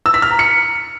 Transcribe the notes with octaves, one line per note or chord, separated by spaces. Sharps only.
E6
B6
F6
A#5
C#7